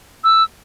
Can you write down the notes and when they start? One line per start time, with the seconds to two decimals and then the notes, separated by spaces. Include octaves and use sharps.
0.24 E6